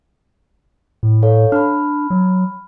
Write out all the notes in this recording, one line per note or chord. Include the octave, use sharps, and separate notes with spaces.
A2
A4 C#5 F5
D4 B5 F6
F#3